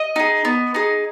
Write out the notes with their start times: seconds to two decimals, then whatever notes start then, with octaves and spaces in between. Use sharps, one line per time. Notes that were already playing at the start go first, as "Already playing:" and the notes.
Already playing: D#5
0.16 D#4 G#4
0.45 B3
0.74 D#4 G#4